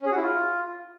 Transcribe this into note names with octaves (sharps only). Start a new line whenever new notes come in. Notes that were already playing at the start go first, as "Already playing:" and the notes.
C#4
G#4
F#4
E4
F4